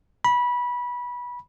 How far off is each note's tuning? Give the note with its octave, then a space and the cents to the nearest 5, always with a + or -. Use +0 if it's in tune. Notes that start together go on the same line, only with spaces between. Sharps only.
B5 -20